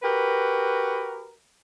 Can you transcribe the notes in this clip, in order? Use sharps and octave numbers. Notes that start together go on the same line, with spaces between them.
F#4 G4 A#4 B4